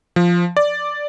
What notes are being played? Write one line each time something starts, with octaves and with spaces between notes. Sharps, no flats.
F3
D5